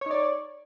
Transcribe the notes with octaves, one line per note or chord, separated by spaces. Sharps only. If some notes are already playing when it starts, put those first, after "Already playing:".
D#4 C#5 D5